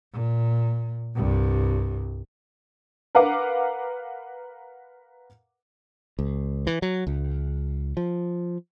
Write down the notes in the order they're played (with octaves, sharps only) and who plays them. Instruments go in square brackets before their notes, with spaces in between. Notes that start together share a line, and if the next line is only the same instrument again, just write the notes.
[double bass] A#2
C2 G2
[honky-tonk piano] A#4 B4 F5 F#5 D6
[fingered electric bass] C#2
E3
F#3
C#2
F3